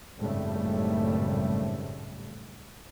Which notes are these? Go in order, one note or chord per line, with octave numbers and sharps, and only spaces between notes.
G#1 F#2 A2 C#3 G3 A3